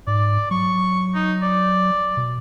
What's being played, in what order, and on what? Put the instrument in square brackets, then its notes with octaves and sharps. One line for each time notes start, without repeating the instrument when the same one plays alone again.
[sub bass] G#2 [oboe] D5
[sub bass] F#3 [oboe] C#6
[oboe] D#4
D5
[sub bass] B2